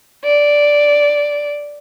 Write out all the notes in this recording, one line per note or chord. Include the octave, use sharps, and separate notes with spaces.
D5